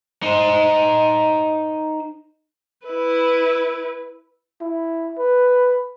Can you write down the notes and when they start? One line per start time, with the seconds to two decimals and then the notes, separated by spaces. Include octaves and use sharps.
0.22 D#4 C5
2.86 E4 B4
4.61 E4
5.18 B4